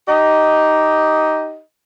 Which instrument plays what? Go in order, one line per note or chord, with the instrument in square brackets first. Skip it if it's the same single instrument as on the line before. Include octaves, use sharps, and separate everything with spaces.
[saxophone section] D#4 G4 D#5